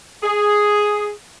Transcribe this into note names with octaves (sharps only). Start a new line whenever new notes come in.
G#4